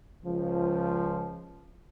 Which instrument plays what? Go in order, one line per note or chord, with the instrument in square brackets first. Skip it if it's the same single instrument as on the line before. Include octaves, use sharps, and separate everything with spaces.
[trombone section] C#2 F3